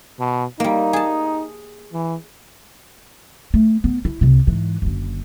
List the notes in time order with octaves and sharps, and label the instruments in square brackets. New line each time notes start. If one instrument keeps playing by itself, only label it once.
[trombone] B2
[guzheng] G3 A#3 [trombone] D#4
[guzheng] G#4 A5
[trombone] E3
[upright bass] A3
B3
E4
C2 C3
G#2 E3
F#1 D3